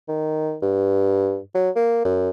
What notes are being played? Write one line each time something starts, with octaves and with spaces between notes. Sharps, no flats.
D#3
G2
F#3
A#3
F#2